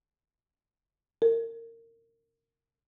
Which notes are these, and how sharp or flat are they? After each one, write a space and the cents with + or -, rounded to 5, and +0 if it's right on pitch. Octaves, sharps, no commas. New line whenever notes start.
A#4 -25